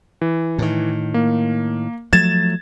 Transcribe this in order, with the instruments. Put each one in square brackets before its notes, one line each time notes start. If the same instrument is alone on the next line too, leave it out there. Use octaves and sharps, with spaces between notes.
[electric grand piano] E3
[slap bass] A2 D#3
[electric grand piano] A#3
[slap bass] F3 F#3 A3 [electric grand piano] G#6 A6 E7